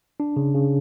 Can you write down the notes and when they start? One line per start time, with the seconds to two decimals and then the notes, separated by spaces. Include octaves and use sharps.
0.20 D4
0.36 C#3
0.54 C#3